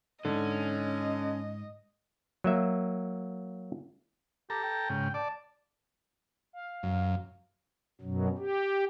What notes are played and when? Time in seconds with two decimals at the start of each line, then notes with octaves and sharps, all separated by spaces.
0.25 G#2 D3 C#4 D#5
2.44 F#3 A#3 E5
4.50 G4 A4 A#5
4.63 G5
4.90 G#2 C#3
5.14 D5 A5
6.53 F5
6.83 F#2
8.01 F#2 B2 F#3
8.38 G4